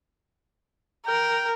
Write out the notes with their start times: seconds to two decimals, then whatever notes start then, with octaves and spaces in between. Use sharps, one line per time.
1.07 A#4 G5